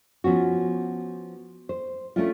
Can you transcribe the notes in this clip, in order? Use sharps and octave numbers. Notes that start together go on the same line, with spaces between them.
F3 B3 C#4 F#4
C5
A3 C#4 D4 E4 F4